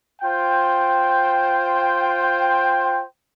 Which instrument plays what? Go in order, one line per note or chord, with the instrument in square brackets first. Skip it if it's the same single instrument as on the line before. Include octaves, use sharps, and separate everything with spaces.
[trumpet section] F4 C5 G5